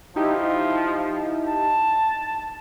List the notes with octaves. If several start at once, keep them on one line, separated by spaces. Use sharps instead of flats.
F3 D#4 E4 G4
A5